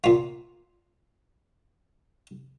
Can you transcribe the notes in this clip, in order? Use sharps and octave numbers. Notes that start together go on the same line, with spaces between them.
A#2 F4